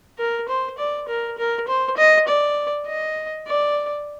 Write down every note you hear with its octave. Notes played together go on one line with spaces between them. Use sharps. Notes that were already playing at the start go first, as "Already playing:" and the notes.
A#4
C5
D5
A#4
A#4
C5
D#5
D5
D#5
D5